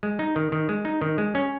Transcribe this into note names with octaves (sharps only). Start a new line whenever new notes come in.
G#3
D#4
D#3
D#3
G#3
D#4
D#3
G#3
C#4